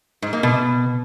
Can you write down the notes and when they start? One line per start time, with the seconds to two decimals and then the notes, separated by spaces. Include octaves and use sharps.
0.22 G#2
0.33 A#3
0.43 B2